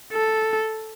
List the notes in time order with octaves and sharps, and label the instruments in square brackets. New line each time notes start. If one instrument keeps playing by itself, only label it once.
[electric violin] A4